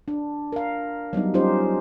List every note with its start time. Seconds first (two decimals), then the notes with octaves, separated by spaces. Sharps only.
0.08 D4
0.52 A#4 F5
1.13 F#3 G3 B3 D#4
1.34 C#4 D#4 F4 G4 C5